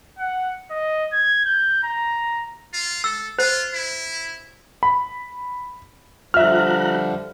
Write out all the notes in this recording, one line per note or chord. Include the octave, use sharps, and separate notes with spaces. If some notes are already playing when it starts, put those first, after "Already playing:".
F#5
D#5
G#6
G6
A#5
F4
A4 E6
F4 C5
E4
B5
D3 F3 G3 F4 E5 A#5 F6 F#6